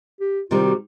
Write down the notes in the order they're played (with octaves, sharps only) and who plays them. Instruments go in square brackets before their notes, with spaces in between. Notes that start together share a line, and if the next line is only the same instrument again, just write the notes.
[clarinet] G4
[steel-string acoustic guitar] C3 D#3 G3 [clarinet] F4
[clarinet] F#4